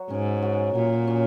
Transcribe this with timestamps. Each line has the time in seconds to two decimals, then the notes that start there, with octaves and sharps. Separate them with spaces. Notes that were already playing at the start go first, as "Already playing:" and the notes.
Already playing: F#3 F#4
0.10 G#2 C#4
0.42 F#4
0.75 A#2 F#3
1.07 C#4